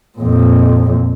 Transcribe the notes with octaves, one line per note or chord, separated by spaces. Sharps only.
F2 A#2